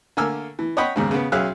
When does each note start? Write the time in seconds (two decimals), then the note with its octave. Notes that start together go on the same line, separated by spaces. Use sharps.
0.17 D3 A3 A#3 G#5 E6 F6
0.59 E3
0.77 C#5 D#5 F#5 G5 B5
0.96 D#2 G#2 C#3
1.11 C#3 B3
1.32 B1 C#4 G#4 E5 F5 F#6